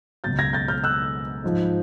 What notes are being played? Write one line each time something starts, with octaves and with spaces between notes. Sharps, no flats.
C#2 B2 F#3 G6 A6
G#6 A#6
G6 A6
F6 G6
E6 F#6
G#2 F3